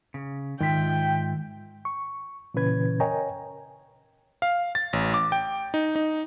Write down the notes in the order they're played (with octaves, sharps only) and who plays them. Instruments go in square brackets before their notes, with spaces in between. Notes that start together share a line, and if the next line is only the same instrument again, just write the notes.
[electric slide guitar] C#3
[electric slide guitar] G#2 F4 E5 [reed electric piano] D#3 [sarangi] G5
[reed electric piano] C#6
A#2 C#3 E3 C#4 B4 G#6
A#4 C#5 D#5 G5 G#5 A#5
[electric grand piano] F5
A6
A1
D6
G5
D#4
D#4